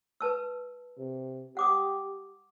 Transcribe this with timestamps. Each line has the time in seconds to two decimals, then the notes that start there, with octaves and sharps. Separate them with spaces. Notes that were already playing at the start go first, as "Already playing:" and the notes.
0.21 B4 A5 E6
0.98 C3
1.57 G4 F#5 D6 D#6